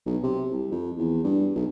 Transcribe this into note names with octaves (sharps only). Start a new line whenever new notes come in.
B1
C3
C2
F2
E2
G2
B1